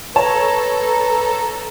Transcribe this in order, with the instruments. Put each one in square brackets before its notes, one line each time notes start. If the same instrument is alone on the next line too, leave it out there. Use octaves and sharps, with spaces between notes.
[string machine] A4 [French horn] B4 [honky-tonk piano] C#5 A5 [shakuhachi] A#5